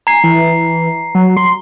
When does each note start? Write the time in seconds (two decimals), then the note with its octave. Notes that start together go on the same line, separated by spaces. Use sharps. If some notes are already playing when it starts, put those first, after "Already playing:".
0.07 G#5 A#5 C7
0.24 E3
1.15 F#3
1.37 C6